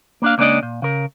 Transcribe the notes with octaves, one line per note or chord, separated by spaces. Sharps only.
A#3 D4 F5
C#2 A#3 C#4 D4 D5 D#5
A#2
C#3 A#4